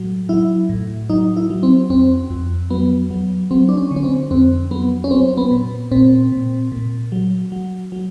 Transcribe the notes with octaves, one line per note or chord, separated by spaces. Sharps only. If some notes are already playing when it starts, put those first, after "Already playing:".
Already playing: A2 F#3
F#3 E4
A2
F#3 D#4
E4
F#3
C4
F2 C4
F2
F#3 B3
F#3
F#3 C4
D4
C#4
D3
C#4
C4
F2 C4
F#3 B3
C#4
F#3 C4
B3
A#2
A#2 C4
A#2
A#2
F#3
F#3
F#3